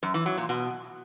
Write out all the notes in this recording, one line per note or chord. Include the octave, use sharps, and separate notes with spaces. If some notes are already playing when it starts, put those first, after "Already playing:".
F#2
E3
F#3
A#2
B2